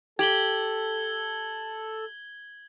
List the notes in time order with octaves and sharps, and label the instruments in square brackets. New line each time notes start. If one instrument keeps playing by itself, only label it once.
[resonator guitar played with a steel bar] G4 [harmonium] A4 [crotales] G#6 F#7 G7